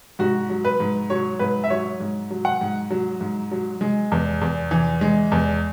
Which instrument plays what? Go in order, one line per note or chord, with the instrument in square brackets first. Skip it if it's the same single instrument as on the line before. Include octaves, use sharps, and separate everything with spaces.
[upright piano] G#2 F#4
F#3
B4
G#2
F#3 C#5
G#2 B4
E5
F#3 C#5
G#2
F#3
F#5
G#2
F#3
G#2
F#3
G#3
E2
E2
E3
G#3
E2